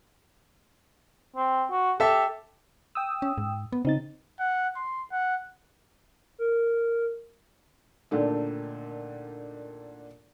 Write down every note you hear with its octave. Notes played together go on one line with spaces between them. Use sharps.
C4
F#4
G4 A4 E5
G5 D#6 E6
C#4
G#2
B3
C#3 C4 D#4 A6
F#5
C6
F#5
A#4
A#2 D3 D#3 A3 D4